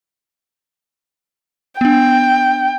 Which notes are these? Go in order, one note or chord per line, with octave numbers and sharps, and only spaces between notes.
B3 D4 G5